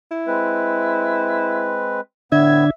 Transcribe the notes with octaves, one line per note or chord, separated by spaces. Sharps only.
E4
G#3 C4 B4
A2 D3 B3 D4 E5 G#6